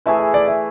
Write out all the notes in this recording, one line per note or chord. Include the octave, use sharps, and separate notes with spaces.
E3 A3 E4 G#4 E5
E5
D5
E5